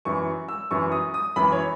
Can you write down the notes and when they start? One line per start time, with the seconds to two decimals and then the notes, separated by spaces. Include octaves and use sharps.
0.05 F#2 E3 C#6
0.48 E6
0.71 F#2 E3 C#6
0.92 D#6
1.14 D#6
1.36 F#2 E3 B5
1.52 C#5